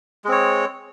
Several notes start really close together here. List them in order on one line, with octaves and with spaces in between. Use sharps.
G#3 C4 C#5